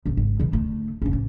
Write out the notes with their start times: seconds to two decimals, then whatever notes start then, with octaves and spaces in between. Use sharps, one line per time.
0.06 D#1 A1
0.17 G#1
0.40 B2 D#3
0.52 D2 A3
1.02 F1 C#4
1.13 A1